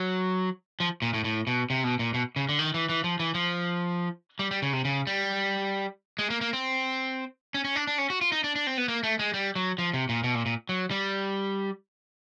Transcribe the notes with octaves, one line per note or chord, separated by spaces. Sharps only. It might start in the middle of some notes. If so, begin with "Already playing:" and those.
Already playing: F#3
F3
A#2
A2
A2
B2
C3
B2
A#2
B2
C#3
D3
D#3
E3
E3
F3
E3
F3
G3
G3
C#3
C3
C#3
G3
G#3
A#3
A#3
C4
C#4
C#4
D4
D4
C#4
F#4
F4
D#4
D4
D4
C4
B3
A#3
A3
G#3
G3
F#3
F3
C3
A#2
B2
A#2
A#2
F#3
G3